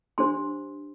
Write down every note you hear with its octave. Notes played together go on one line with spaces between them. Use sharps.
D4 G4 C5 C6